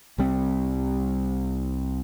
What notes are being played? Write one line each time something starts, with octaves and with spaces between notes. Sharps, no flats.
C2 G3 C4